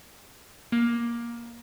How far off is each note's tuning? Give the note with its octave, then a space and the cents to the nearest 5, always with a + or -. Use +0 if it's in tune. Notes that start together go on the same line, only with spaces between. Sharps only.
A#3 +15